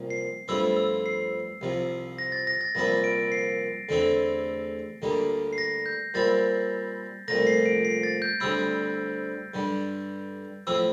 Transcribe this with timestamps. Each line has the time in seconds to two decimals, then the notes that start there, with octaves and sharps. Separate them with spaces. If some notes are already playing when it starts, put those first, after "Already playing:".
Already playing: C2 A#2 F3 A#3
0.10 C7
0.48 G2 F3 A3 C4 E4 E6
0.77 E6
1.06 C7
1.61 C2 C3 F3
2.18 A#6
2.32 A6
2.47 A#6
2.61 A6
2.75 C2 A#2 F3 A#3 E4 A#6
3.04 D7
3.32 C7
3.89 E2 D3 A3 C4 E4
5.02 D2 D3 G3 A#3
5.53 C7
5.58 A#6
5.86 G6
6.14 A#2 G3 C4 E4 A6
7.28 C2 A#2 F3 A3 A#6
7.47 C7
7.66 D7
7.85 C7
8.03 A6
8.22 G6
8.40 D2 D3 G3 C4 E4 E6
9.54 G2 D3 G3
10.67 A2 F3 C4 E4 E6